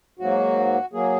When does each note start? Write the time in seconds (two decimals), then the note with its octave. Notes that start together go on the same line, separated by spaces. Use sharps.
0.19 G#2 F#3 A#3 F#4
0.93 F#3 A#3 G#4